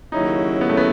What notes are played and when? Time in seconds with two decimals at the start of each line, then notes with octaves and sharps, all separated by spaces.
0.12 D#2 C#3 F#3 C#4 D#4 E4
0.61 B3
0.69 A3
0.77 B3